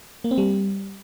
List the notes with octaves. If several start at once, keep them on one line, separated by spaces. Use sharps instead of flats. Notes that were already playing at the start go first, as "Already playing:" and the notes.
A#3
C4
G3